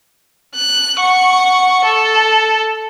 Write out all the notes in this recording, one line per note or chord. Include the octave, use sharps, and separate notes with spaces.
F#6
F#5 C#6
A4